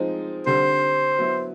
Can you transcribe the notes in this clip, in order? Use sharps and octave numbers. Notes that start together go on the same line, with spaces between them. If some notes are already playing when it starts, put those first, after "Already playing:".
Already playing: F3 G#3 C4 D#4
D3 G3 C4 C5
F#3 B3 E4